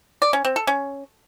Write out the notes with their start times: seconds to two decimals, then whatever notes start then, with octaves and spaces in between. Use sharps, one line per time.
0.22 D5
0.33 C#4
0.45 C4
0.56 A4
0.67 C#4